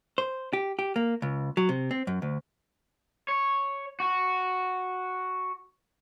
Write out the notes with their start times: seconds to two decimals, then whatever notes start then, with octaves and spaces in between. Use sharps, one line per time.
0.18 C5
0.53 G4
0.79 G4
0.96 A#3
1.22 C#2
1.57 F#3
1.69 C3
1.91 C4
2.07 F#2
2.22 D2
3.28 C#5
4.00 F#4